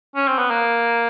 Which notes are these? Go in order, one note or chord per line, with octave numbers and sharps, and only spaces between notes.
C#4
C4
B3
A#3